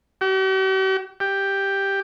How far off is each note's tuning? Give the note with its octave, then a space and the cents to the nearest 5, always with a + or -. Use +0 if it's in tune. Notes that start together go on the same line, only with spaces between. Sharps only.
G4 -45
G4 +5